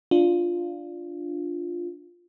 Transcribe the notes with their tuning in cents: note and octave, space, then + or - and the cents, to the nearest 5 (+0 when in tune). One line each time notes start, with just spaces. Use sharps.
D4 +0 F4 +0